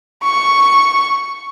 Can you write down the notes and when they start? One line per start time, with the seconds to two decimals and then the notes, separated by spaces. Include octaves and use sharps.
0.23 C#6